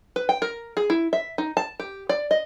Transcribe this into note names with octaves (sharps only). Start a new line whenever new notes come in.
B4
G5
A#4
G#4
E4
E5
D#4
A5
G4
D5
D#5